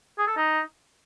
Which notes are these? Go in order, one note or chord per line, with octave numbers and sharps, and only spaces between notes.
G#4
A4
D#4